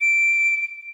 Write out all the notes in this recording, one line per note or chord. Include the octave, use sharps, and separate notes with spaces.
D7